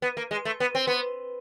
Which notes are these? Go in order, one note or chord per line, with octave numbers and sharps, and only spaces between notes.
B3
A#3
G#3
A3
B3
C4
B3